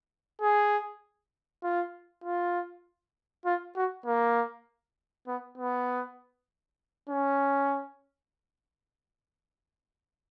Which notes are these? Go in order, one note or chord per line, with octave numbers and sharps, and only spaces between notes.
G#4
F4
F4
F4
F#4
A#3
B3
B3
C#4